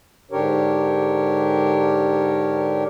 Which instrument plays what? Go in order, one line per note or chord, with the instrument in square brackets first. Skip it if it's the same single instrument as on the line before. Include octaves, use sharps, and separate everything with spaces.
[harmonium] G#2 D3 D4 G4 A#4 C#5